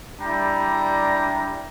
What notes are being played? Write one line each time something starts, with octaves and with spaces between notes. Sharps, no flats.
G3 D4 E4 G5 A#5